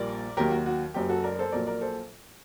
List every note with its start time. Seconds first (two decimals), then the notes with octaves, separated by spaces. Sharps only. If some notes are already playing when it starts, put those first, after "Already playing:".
Already playing: A#1 A#2 G3 A#4 D5
0.37 D#2 D#3 F#3 G4 A#4
0.51 F#4
0.66 F#4
0.94 F#1 F#2 F#3 G4
1.09 F#4 A4
1.24 A#4 D5
1.39 A4 C5
1.52 A#1 A#2 F#3 A#4 D5
1.67 A#4 D5
1.81 A4 C5